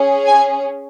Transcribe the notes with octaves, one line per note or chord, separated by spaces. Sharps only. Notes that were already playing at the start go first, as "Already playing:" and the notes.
Already playing: C#4 G#4
G#5